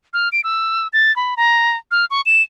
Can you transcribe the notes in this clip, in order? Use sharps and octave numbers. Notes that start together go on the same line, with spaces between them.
F6
D7
E6
A6
B5
A#5
F6
C#6
E7